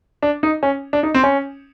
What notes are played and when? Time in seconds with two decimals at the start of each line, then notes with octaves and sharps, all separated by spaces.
0.23 D4
0.43 D#4
0.63 C#4
0.93 D4
1.03 D#4
1.14 C4
1.23 C#4